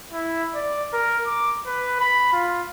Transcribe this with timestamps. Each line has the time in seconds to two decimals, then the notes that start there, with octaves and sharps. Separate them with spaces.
0.12 E4
0.55 D5
0.93 A#4
1.27 D6
1.67 B4
2.00 B5
2.33 F4